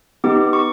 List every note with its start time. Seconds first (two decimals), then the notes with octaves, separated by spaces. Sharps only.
0.24 B3 D#4 G4 D6
0.53 C#6